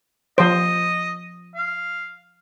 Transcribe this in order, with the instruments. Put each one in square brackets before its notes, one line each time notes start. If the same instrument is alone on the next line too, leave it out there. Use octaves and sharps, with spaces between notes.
[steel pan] F3 C5 [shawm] D#5
[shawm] F5